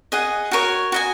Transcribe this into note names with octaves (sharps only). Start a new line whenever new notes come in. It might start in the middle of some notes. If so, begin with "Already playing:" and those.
G#4 D#5 F#5
F#4 A#4 C#5
F#4 D#5 G#5